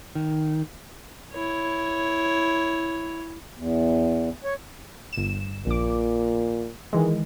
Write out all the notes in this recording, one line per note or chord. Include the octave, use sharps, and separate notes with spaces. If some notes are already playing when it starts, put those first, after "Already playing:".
D#3
E4 C#5
E2
C#5
G1 E7
A#1 A#2 D6
D#3 E3 G#3